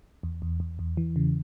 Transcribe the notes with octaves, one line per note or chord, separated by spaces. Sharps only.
E2
E2
E2
E2
E3
C#3